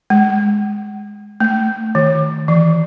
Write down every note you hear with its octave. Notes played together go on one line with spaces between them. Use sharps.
G#3
A3
D#3
E3